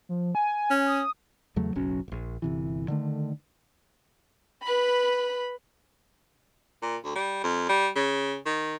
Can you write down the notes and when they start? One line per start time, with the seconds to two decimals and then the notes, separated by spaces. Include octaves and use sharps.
0.09 F3
0.35 G#5
0.70 C#4
0.87 D#6
1.56 E2 C#3 F#3 A3
1.75 F#1 B1 F#3 C#4
2.08 E1 A#1
2.42 G1 C3 E3
2.88 D3 D#3 A3
4.63 B4 B5
6.82 A#2
7.04 D2
7.15 G3
7.43 F2
7.69 G3
7.96 C#3
8.46 D#3